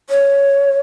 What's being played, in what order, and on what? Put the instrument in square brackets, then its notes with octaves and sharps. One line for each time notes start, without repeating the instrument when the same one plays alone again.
[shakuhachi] C#5